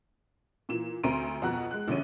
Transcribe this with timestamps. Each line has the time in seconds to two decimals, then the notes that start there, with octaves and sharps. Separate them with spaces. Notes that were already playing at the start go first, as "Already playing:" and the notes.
0.69 A#2 E3 E7
1.03 D2 C4 A#5 C6 D7 D#7
1.42 F2 B2 F#5 A#5 F#6
1.71 G#3 F#6
1.88 A#1 D3 C#4 D#7